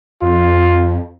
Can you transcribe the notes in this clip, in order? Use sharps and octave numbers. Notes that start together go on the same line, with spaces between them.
F2 F4